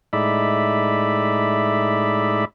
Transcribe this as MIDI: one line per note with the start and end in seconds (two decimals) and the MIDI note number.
0.13 2.45 45
0.13 2.45 56
0.13 2.45 63
0.13 2.45 74
0.13 2.45 76
0.13 2.45 83